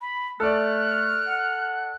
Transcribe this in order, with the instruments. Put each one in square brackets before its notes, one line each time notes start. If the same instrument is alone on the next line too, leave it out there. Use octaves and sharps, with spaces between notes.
[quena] B5
[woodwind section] A3 [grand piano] A4 D5 [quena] F6 [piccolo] F#6
[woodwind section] F#5